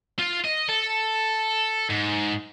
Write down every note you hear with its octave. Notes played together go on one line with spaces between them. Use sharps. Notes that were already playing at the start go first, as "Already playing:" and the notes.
F4
D#5
A4
G#2